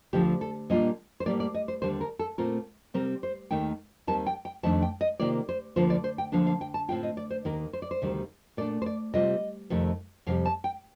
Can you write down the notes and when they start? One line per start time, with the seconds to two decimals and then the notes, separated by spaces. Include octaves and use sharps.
0.13 D2 D3 F3 G4
0.41 A4
0.70 A#2 G3 A#3 D4 F4 D#5
1.20 C5
1.26 A2 G3 A#3 D5
1.40 D5
1.54 D#5
1.68 C5
1.82 D#2 D3 G3 C5
2.01 A#4
2.19 A4
2.38 A#2 A3 C4 F4 A#4
2.94 C3 G3 C4 A#4
3.23 C5
3.51 D#2 D#3 A3 D#4 G5
4.07 D#2 D#3 G3 C4 A5
4.27 G5
4.45 G5
4.63 F2 D#3 A3 D4 A5
4.82 G5
5.01 D#5
5.20 C3 D#3 A#3 F4 D5
5.49 C5
5.76 D2 D3 F3 A#3 F4 C5
5.90 D5
6.04 C5
6.18 G5
6.32 D3 F3 A#3 D4 F5
6.47 F5
6.61 G5
6.74 A5
6.88 A2 A3 C4 F4 G5
7.03 D#5
7.17 D5
7.31 C5
7.45 D#2 D#3 A#3 A#4
7.73 C5
7.82 D5
7.91 C5
8.02 D2 C3 D#3 G3
8.57 A#2 A3 D4 D5
8.82 C5
8.86 D5
9.14 C3 G3 C4 F4 D#5
9.70 F2 C3 D#3 A3
10.27 F2 C3 G3 F5
10.45 A5
10.64 G5